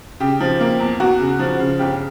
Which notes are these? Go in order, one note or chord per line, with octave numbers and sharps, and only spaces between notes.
C#3 G4
F3
A#3
E2
E2 F#4
C#3
F3
C#3
G1 G4